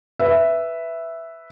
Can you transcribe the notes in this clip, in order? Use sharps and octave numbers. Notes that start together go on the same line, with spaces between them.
B4 E5